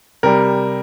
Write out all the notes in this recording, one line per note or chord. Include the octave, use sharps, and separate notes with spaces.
C3 G3 A#4